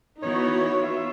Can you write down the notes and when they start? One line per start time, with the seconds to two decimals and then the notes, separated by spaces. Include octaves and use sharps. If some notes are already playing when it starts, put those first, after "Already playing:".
0.23 E3 B3 D#4 E4 F#4 C#5
0.78 F4 E5